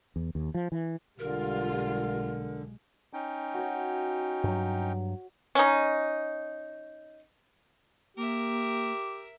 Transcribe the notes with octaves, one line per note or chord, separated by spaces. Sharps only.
E2
D#2
F3
E3
B1 D3 G3 G#3 F4 A#4
C#4 D#4 G5
F#4 C#5
G2 F#3
C#4 D#4
A#3 G4 A#4 E5